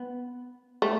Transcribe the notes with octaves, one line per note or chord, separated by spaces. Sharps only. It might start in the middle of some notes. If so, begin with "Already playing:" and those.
Already playing: B3
A3